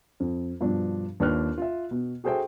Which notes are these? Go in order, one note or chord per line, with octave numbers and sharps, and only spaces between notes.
F2
G2 B2 F3 D4
D#2 D4 F4 B4 F6 F#6
F4 E5
B2
F#4 G#4 A4 C5 E5 G5